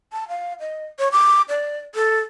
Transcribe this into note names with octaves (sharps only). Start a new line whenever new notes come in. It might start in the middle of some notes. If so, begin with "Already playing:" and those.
A5
F5
D#5
C#5
D6
D5
A4